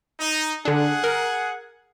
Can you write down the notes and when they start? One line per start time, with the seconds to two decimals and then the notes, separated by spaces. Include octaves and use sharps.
0.20 D#4
0.65 D3 D4 G#4 F#5
1.04 A#4